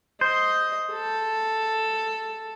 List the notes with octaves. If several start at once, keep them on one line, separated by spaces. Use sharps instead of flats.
C5 D#5
A4